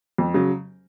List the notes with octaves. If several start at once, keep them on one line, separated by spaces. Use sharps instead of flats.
F2
C#3 F#3